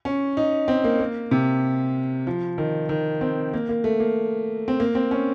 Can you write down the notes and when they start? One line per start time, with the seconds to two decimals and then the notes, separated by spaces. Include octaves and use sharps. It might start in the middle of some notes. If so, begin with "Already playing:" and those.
0.05 C#4
0.37 D#4
0.68 C4
0.84 A#3
1.00 A#3
1.31 C3
2.27 F3
2.58 D#3
2.89 D#3
3.21 C4
3.53 A#3
3.69 A#3
3.84 A3
4.00 A#3
4.68 C4
4.80 A#3
4.95 C4
5.11 C#4